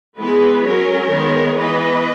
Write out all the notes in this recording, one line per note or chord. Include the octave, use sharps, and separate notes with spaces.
E3 G#3 B3 G#4 B4
F#3 C#4 A#4 C#5
D#3 G#3 B3
E3 B3 B4 D#5